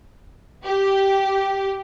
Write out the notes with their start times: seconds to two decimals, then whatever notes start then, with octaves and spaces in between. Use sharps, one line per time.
0.63 G4